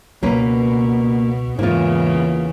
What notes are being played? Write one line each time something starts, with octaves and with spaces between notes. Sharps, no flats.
C#2 B2 A#3 C#4 B4
E2 G#2 C#3 E3 A#3 F4